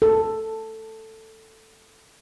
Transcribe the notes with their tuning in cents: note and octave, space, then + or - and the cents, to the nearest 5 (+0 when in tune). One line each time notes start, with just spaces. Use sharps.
A4 +10